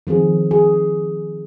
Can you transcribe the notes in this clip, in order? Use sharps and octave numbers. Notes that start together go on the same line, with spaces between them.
D#3 F3 C4 G#4
G#4